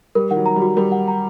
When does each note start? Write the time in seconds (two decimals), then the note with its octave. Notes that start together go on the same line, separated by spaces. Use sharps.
0.15 G3 A#4
0.31 D#3 F#5
0.36 F#3
0.46 A#5
0.56 G3
0.62 F#4
0.77 G3 A#4
0.92 F#5
1.08 A#5